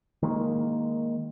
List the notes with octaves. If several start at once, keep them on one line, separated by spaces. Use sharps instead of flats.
D#3 G#3 A#3